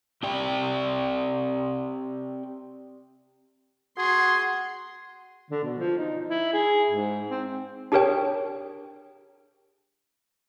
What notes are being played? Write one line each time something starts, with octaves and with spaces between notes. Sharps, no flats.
C4 G4 D5 G5
F#4 G#4 C6
D3
B2
F3
D#4
E4
G#4
G#2
C4
D4 G4 G#4 A#4 C#5 G5